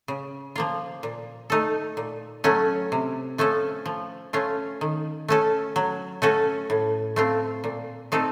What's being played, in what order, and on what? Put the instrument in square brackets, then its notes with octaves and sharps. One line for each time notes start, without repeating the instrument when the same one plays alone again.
[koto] C#3
F3 A#3 F4
A#2
A3 D#4 A4
A#2
F#3 A3 C#4
C3
F3 A3 C#4 A4
F3
A3 C#4 F4
D#3
A3 C#4 A4
F#3
A3 C#4 F#4 A4
A2
A3 C4 F4
A#2
A3 C4 D#4 A4